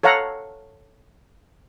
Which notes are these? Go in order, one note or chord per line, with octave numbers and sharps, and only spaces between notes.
A4 C#5 F5 F#5 A#5